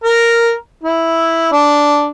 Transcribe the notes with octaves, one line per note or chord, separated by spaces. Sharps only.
A#4
E4
D4